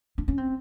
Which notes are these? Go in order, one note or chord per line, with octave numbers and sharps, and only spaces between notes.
D4
C#4
C4